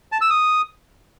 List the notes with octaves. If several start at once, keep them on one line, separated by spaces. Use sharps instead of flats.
A5
E6
D#6